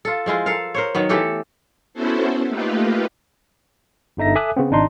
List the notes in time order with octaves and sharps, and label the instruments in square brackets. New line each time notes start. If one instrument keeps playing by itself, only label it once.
[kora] F4 A4
F3 G#3 E4 F4
A4 A#4 F5
A#4 C5 C#5
D#3 F#3 B3
E3 A3 G4 A4
[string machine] B3 C#4 E4 F#4 A4 C5
A3 A#3 D#4 F4 G4 B4
[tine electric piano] G1 D3 D#4 E5 A#6
A4 E5 G#5 D6 D#6 F#6
C#3 B3 C4
G#1 D4 D#4 C6